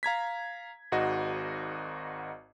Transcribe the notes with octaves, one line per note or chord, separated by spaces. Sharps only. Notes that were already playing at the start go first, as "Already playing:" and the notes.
F5 A#5 G#6 B6
G#1 G#2 F#4 D#5